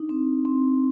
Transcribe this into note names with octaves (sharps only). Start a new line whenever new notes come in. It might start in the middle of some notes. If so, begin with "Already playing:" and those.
Already playing: D4 D#4
C4
C4